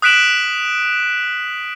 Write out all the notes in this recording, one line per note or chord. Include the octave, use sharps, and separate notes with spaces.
D#6 F#6 B6 D7 E7 F#7